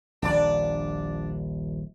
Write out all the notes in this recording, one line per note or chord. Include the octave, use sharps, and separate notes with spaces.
D#1 A#1 D4 D5